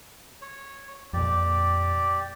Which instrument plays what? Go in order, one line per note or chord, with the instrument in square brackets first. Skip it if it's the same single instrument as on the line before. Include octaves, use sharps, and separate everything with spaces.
[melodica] C#5
[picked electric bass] F2 A#2 [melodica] G4 D5